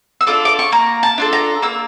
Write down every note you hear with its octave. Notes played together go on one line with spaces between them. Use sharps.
E6
D4 F4 A4 D6
D6
C#6
A#3 A#5
A5
D4 F4 A4
A#5
A#3 E6